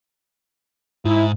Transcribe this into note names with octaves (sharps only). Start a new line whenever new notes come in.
G#2 E4